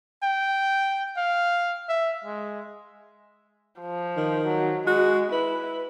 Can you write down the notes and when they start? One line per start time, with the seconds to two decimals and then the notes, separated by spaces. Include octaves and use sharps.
0.23 G5
1.17 F5
1.89 E5
2.24 G#3
3.80 F3
4.17 D#3
4.47 F#3
4.87 G#3 F#4
5.32 E4 B4